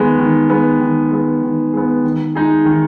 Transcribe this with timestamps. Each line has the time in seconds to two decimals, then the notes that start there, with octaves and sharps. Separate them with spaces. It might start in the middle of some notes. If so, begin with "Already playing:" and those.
Already playing: D#3 G#3 B3
0.19 D#3
0.49 G#3 B3
0.80 D#3
1.11 G#3 B3
1.43 D#3
1.73 G#3 B3
2.04 D#3
2.35 G#3 D#4 G#4
2.65 D#3